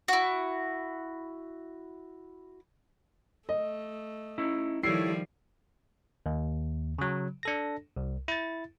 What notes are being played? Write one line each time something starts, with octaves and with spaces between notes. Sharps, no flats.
E4 F#4
A3 D#5
C#4 D#4 E4
D#3 F3 G3 E4 A4 C#5 C7
D#2
C#3 F#3
D4 A4 A#6
C2
E4 A6